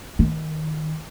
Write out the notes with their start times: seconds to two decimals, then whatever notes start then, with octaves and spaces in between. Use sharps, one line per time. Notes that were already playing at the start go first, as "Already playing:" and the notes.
0.19 D#3